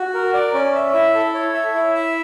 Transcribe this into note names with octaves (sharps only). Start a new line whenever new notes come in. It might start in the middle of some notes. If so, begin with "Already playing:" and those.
Already playing: F#4
A#4
D5
C#4
E5
E4
A4
C#5
E5
E4
E5